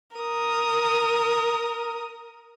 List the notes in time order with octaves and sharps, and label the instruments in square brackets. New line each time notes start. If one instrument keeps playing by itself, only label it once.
[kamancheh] A#4 D#6